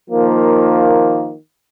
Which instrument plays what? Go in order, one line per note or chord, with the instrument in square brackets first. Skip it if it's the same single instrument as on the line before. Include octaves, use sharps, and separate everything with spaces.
[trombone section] D#3 F3 A#3